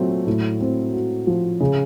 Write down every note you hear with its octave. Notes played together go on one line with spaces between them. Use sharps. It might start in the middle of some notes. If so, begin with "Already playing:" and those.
Already playing: A#2 F#3 A3 C4
A2
C4
F#4
F3
C#3